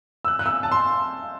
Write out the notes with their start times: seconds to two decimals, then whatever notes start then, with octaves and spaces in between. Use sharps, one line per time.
0.25 E6
0.28 F#6
0.39 F#6
0.46 E6
0.63 A5
0.72 C6